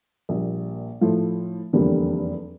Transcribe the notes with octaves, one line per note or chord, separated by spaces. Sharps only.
A#1 A#2 G3
A2 F3 A3
F1 E2 D3 G3 A#3